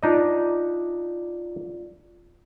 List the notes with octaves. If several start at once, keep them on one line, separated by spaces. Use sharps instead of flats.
D4 D#4 F4 D5 D#5